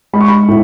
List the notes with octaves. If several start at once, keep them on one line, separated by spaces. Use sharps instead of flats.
G#3 B5
C#6
B5
A2